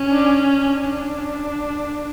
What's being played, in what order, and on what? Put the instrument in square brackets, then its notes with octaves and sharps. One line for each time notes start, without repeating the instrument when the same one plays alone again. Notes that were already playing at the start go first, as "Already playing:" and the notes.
Already playing: [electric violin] C#4
[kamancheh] D4
D4